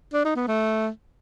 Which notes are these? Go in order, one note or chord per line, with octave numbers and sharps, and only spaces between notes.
D4
D#4
B3
A3